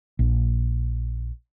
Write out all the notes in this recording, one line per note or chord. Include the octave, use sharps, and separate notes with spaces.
A#1